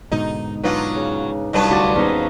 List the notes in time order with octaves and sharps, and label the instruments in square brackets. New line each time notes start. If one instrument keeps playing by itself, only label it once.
[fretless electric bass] G#2 B2 D3 [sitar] D#4
[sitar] F#3 F4 F#4 [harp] D4 D#4 B4
[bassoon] C#3
[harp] C2 A5 [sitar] G2 F#3 B4
[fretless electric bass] D2 [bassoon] F#4 [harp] C6 D6 A6
[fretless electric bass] D#2 A3 B3 [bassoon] G#2 [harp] C#4 D#4